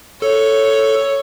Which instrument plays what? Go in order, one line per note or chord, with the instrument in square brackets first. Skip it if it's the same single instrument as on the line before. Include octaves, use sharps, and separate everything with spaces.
[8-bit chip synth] A4 [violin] C#5